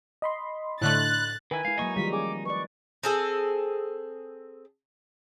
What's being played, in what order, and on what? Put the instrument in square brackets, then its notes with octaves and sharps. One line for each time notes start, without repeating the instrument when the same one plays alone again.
[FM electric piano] D#5 B5 C6
[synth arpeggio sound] A2 D3 A3 [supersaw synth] F#6 [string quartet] A6
[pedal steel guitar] D#3 E4 [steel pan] A#4 B4 [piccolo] G#5
[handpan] G#3 E4 [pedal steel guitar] F5
[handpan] F#3 A#3 D#5 [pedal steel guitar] D#4 C#6
[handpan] D#3 F3 G#3 [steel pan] G3 F4 [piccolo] B6
[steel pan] C#4 G#4 G#5 [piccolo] D6
[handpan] B4 D5 [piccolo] C#6
[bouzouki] C4 G#4 A4